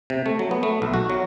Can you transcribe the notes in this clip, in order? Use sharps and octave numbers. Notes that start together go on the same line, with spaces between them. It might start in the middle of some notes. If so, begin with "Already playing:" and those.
C3
A3
F#3
B3
A3
B1
F#4
F#3